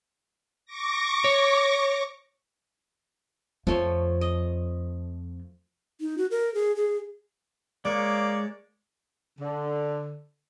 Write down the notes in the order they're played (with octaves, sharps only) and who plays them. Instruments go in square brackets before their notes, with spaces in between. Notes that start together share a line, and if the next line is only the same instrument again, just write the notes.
[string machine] C#6 D6 A#6
[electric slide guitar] C#5
[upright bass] F2 [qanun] F3 A3 C#5
[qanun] D#5
[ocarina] D#4
F#4
A#4
G#4
G#4
[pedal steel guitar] G#3 C#5 [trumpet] A#3 [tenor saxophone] D5
[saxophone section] D3